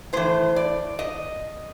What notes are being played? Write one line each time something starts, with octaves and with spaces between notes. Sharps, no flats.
A2 E3 C5
D5
D#5